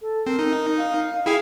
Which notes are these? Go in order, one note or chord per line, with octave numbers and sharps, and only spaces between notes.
A4
C4 A#4
D#4
F5
E4 G#4 F5 G5